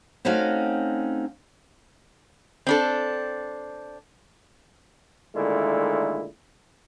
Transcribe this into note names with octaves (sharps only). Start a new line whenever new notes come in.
A3 C4 C#4 D#4 F#4 F5
C4 D4 A4
A#2 D3 D#3 G#3 A3 E4